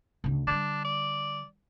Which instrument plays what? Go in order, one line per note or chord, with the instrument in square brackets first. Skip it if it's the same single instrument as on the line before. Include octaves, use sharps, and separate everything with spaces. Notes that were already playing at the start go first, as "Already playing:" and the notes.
[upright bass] D2 C#3
[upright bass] D3 G3 [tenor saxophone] D4
[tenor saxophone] D5